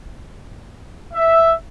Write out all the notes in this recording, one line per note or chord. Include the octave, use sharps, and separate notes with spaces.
E5